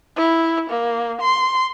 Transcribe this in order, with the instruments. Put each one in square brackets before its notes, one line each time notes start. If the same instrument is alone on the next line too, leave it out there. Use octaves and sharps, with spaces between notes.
[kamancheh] E4
A#3
C6